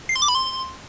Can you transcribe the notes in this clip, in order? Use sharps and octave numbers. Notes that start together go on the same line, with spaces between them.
C7
C6
D6
B5
C6